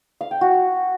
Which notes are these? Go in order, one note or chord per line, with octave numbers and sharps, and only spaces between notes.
F5
G5
F#4